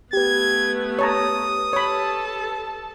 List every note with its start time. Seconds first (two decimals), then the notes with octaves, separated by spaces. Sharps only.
0.13 A3 B3 G4 B4 G#6
0.99 C#5 A5 A#5 D#6
1.73 A4 C#5 A5 B5